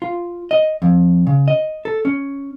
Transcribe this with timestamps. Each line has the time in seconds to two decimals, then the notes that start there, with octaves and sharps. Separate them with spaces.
0.02 F4
0.51 D#5
0.82 F2
1.27 C#3
1.48 D#5
1.85 A4
2.05 C#4